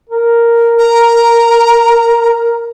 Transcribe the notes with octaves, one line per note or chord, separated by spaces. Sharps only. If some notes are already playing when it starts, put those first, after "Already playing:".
A#4
A#5